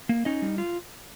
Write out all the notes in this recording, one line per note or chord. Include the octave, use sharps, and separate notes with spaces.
A#3
C#4 D#4 D#5
G3
F4